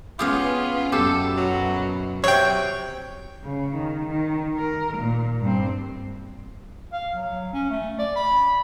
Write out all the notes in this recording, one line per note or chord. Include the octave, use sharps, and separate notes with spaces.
B3 C#4 F4 G4 G#4 F5
F#2 B2 G4 A4
F#3
C3 F#3 C#5 G5
C#3
D#3
D#3
A#4
A#2
G2 C4
F5
F#3
C#4
A3
D5
B5